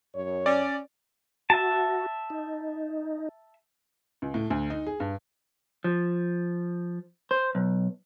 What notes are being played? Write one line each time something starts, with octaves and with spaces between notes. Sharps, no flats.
F#2 C#5
C#4 D5
F#4 E5 A5
D#4
C#2
A2
D2
D#4
G#4
G2
F3
C5
B1